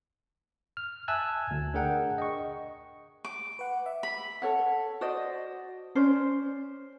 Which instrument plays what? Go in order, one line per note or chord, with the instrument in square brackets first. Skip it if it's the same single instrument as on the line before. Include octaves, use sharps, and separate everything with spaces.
[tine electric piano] F6
E5 G#5 A5 E6 F#6 G#6
D2
D4 G#4 A#4 F#5 G5
D#5 C#6
[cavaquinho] D6
[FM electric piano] B4 F#5
E5
[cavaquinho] B5
[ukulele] A4 C#5 F#5
F#4 C5 D5 D#5
C#4 C5 D5